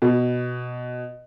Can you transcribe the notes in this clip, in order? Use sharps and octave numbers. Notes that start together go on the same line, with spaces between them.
B2